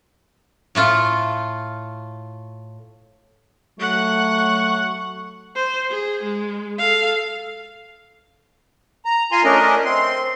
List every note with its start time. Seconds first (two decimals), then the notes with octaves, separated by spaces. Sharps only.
0.75 A2 A3 F4
3.80 F#3 A3 F#5 C#6 F#6
5.56 C5
5.90 G#4
6.24 G#3
6.79 A4 F5
9.05 A#5
9.32 F4 G#5 A#5 C6
9.44 A3 C#4 D4 A#4 D#5
9.85 C4 C6